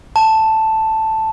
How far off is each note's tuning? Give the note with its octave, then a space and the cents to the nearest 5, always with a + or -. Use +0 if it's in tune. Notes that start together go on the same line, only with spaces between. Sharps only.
A5 +0